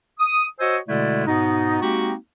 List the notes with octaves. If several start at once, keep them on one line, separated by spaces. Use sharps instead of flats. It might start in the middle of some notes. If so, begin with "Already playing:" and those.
D#6
F#4 C5 C#5 D#5 G#5 E6
B2 D3 G#3 A3 E4 D5
G#2 B2 B3 D#4
G#3 A#3 C4 D#4 F#4 G4